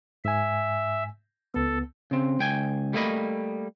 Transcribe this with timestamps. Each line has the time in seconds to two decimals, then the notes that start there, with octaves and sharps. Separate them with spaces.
0.25 G#2 E5 G#5
1.54 C#2 B3 A4
2.11 C#3 C4
2.39 C#2 G5 G#5
2.93 G3 A3 A#3 B4 D#5 B5